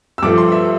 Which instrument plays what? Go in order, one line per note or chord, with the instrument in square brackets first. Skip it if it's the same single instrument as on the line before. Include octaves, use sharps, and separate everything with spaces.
[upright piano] E6
G2 F3 A3 D6
C6
E5